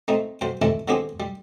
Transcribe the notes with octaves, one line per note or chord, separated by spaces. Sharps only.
A3 C4 D#4
B1 C5 G5
C3 D#3 E3 A3 E4
D3 D#3 B3 C4 G4 G#4
G3